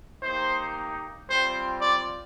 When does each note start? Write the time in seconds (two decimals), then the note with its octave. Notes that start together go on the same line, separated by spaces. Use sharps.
0.22 A#3 D#4 G4 C5
1.29 G3 C4 F4 C5
1.81 D5